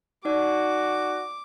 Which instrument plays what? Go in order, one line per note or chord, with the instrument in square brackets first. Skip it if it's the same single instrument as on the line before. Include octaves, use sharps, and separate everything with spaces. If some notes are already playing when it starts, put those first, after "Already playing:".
[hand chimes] D#4 D5 [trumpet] F#4 [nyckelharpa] D6